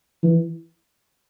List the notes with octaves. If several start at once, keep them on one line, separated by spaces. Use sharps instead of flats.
E3